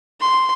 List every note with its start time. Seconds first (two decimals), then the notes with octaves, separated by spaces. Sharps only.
0.21 C6